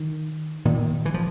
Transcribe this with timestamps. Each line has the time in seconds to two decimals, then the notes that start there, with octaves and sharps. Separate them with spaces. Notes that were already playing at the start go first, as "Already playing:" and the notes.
Already playing: D#3
0.65 A#2 D#3
1.06 E3
1.14 F3